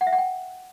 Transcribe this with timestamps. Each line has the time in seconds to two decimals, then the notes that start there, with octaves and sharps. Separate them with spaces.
0.01 F#5
0.07 E5
0.13 F#5
0.18 G5